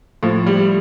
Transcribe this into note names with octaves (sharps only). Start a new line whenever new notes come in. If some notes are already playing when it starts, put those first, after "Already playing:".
A2 F3
G3